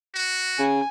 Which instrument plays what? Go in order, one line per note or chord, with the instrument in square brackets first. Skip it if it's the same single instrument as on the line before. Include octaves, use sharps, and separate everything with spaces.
[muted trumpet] F#4
[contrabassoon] C#3 [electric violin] G#5